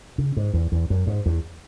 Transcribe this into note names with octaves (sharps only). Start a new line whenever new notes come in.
C#3
G#2
E2
E2
F#2
G#2
E2